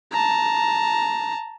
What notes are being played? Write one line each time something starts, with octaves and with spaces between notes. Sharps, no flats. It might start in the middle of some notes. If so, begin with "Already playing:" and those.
A5 A#5